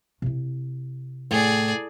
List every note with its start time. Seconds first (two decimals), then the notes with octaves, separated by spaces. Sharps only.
0.22 C3 E4
1.31 A2 G#4 D5